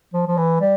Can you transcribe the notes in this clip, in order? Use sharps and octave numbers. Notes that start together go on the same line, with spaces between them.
F3
F3
E3
G3